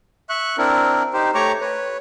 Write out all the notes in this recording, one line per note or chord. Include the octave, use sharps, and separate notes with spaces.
E5 C#6 F#6
C4 D4 E4 A#4
D#4 G4 C5
A3 G4 C#5 A#5 C#6 D6
B4 C#5